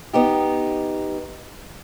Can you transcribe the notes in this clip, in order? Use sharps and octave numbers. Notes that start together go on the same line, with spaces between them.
B3 D#4 G4